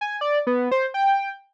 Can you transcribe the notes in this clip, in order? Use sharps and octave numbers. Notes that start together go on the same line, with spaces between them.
G#5
D5
B3
C5
G5